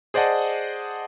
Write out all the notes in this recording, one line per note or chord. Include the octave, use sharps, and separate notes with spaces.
G#4 C5 D5 D#5 F#5 A5